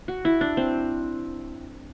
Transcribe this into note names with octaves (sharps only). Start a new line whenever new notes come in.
F#4
E4
D4
C4